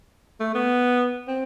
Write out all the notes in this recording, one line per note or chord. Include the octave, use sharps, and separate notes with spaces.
A3
B3
C4